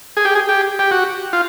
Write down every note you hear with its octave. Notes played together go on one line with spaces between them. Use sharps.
G#4
G4
G#4
G4
G4
F#4
F4